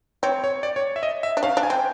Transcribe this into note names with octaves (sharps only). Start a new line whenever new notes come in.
C4 C#5
C#5
D5
C#5
E5
D#5
E5
D4
C#4 F5
D4
G#5
C4
G5